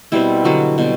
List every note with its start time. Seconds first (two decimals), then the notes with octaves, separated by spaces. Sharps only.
0.12 B2 G3 C4 E4
0.44 D3 F#3 G3 B3 F#4
0.78 B2 G3 C4